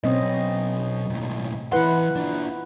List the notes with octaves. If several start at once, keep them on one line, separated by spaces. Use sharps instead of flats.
B2 F#3 C4 C#4 D#5
B1 A2
E3 E4 B4 F#5 C6
D4 F4